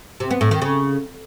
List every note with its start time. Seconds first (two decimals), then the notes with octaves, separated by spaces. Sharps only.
0.20 C3
0.31 B3
0.41 A2
0.51 D#3
0.62 C#3